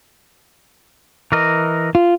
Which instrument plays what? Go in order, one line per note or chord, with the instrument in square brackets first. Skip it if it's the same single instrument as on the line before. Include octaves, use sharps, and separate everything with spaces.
[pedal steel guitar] E3 A#4 D#5
[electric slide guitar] F4